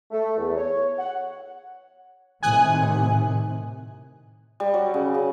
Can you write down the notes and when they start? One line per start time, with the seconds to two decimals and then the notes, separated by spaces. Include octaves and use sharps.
0.11 A3
0.37 E2
0.56 C#5
0.98 F#5
2.43 A2 C3 D#3 G#5 D#6 F#6
4.60 G3
4.74 F#3
4.94 C#3
5.14 C#3